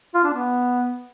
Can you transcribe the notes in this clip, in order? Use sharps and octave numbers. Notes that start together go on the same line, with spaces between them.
F4
D4
B3